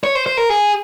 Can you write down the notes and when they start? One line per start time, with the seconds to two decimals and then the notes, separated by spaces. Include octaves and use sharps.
0.04 C#5
0.15 C5
0.26 C5
0.37 A#4
0.50 G#4